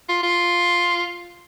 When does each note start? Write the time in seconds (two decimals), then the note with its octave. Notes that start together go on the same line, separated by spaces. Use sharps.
0.09 F4
0.23 F4